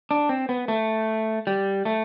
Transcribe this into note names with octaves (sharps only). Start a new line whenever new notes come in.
D4
C4
B3
A3
G3
A3